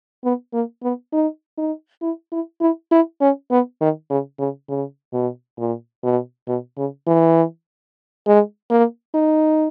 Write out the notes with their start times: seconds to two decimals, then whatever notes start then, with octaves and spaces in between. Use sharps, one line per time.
0.24 B3
0.53 A#3
0.83 B3
1.13 D#4
1.57 D#4
2.02 E4
2.32 E4
2.61 E4
2.92 E4
3.21 C#4
3.51 B3
3.81 D#3
4.10 C#3
4.39 C#3
4.69 C#3
5.13 B2
5.59 A#2
6.04 B2
6.47 B2
6.77 C#3
7.07 E3
8.26 G#3
8.70 A#3
9.15 D#4